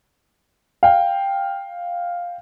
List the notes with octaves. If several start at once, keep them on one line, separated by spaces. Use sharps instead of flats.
F5 G5